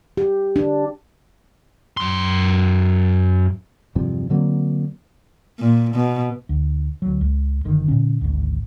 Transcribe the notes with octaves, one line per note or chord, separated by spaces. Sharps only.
G4
D4
F#2 C6
E2 G2 C3 F3
D3 F#3 A#3 C4
A#2
B2
D2
D2 F#3
C#2
F#1 D3 D#3
A#2 D3 C#4
G#1 D2